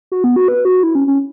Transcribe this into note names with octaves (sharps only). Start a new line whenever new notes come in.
F#4
B3
F#4
B4
F#4
E4
C#4
C#4